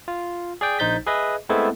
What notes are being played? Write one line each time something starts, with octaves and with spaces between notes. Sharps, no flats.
F4
G#4 D5 G5
A#1 D#4 C5 G6 A6 B6
G#4 B4 D#5 E5
G#3 A3 B3 C4 E4 A4